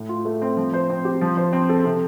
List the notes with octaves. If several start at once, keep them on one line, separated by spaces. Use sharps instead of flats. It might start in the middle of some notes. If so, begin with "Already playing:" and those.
Already playing: A2
F4
A3
C4
F3
C5
C4
G4
F3
C5
C4
A4
C3